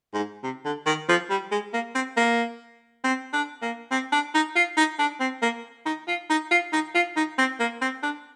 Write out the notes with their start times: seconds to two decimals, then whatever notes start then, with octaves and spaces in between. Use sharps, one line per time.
0.14 G#2
0.43 C3
0.65 D3
0.86 D#3
1.09 F3
1.30 G3
1.52 G#3
1.73 A#3
1.95 C4
2.17 A#3
3.04 C4
3.33 D4
3.62 A#3
3.91 C4
4.12 D4
4.35 D#4
4.56 F4
4.77 D#4
4.99 D4
5.20 C4
5.42 A#3
5.86 D#4
6.08 F4
6.30 D#4
6.51 F4
6.73 D#4
6.95 F4
7.16 D#4
7.38 C4
7.60 A#3
7.82 C4
8.03 D4